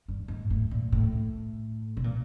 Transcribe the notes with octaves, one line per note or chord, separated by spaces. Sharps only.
G2
G#2
A2
A#2
A2
B2
A#2